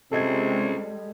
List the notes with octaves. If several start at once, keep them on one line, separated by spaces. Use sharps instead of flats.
C#2 C3 G3 G#3 A4 D#5 G#6